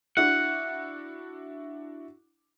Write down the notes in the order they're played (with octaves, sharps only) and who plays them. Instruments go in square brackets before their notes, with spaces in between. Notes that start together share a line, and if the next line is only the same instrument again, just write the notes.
[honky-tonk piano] D4 E4 F#4 [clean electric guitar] F#5